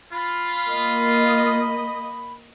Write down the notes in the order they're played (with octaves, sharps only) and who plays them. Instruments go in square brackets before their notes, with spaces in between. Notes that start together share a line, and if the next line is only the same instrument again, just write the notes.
[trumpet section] F4 [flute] B5
[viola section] A#3 D#5